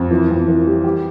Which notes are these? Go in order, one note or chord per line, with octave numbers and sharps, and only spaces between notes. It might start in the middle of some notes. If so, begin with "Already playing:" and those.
Already playing: F2
E3
F2
E3
G3
G4